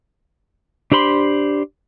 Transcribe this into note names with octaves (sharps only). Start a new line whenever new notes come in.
D4 G4 C5 B5 C6